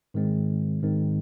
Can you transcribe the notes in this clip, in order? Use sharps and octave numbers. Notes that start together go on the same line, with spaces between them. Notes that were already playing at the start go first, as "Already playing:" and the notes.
G#2 D#3 G#3 C4
G#2 D#3 G#3 C4